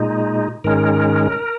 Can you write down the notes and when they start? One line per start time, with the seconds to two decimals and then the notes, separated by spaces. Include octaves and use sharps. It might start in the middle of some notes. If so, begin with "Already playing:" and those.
Already playing: A#2 G#3 D#4
0.64 G#2 D#3 G#3 C#4 A#4